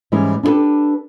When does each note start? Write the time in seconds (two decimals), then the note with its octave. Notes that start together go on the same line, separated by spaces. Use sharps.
0.12 G#2 E3 G3 G#3 C#4 E4
0.43 D4 E4 G4 A4 B4